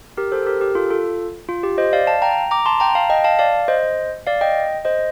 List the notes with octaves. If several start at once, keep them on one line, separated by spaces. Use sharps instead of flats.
G4 A#4
A4 C5
G4 A#4
G4 A#4
F4 A4
F4 A4
F4
G4
C5 D#5
D5 F5
F5 A5
G5 A#5
A#5 D6
A5 C6
G5 A#5
F5 A5
D#5 G5
F5 A5
D5 F5
C5 D#5
D5 F5
D#5 G5
C5 D#5